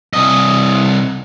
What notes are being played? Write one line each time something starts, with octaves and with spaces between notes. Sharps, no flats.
C2 D#5